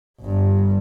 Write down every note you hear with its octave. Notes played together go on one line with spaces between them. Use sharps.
G1 G2